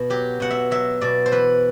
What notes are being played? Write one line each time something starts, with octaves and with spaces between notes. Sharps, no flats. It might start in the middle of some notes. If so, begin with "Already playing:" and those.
Already playing: B2
F#3 G4
B2 F#5
E5
F#3 E5
B2 D5
C5
E3 B4